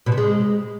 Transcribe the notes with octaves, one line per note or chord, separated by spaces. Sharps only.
B2
C3
G#3